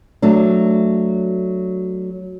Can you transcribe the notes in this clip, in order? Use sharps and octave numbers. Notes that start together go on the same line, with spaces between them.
F#3 A3 D4